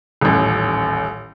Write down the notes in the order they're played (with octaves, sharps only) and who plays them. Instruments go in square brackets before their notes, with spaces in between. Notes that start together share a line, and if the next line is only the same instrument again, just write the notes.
[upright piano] D#1 A1